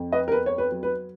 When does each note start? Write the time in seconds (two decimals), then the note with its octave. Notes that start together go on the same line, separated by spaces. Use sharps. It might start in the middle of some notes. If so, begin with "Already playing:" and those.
Already playing: F2
0.12 B4 D#5
0.28 A#4
0.32 B3 B4
0.46 C#5
0.58 B4
0.71 F#3
0.83 B4